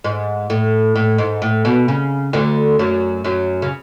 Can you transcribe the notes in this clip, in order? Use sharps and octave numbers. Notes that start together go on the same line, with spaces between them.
G#2
A2
A2
G#2
A2
B2
C#3
D2 D3
F#2 F#3
F#2 F#3
C#3